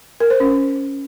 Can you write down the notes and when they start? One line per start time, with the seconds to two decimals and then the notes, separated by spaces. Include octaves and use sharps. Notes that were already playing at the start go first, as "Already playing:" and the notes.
0.20 A#4
0.30 C5
0.40 C#4